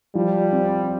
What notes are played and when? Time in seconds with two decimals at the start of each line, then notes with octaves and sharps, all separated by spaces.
0.15 F3 G3
0.52 C4